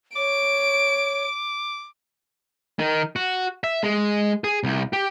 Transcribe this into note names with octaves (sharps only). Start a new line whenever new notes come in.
C#5 D6 D7
D#3
F#4
E5
G#3
G#4
C2
G4